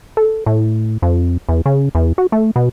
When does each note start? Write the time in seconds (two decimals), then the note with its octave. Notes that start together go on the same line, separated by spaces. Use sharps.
0.17 A4
0.46 A2
1.02 F2
1.49 E2
1.66 C#3
1.95 E2
2.18 F#4
2.32 A3
2.56 B2